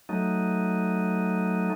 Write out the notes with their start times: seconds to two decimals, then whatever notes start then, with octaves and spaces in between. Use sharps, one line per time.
0.09 F#3 A3 D#4